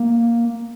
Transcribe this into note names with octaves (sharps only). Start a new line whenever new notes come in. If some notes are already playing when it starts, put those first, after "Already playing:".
Already playing: A#3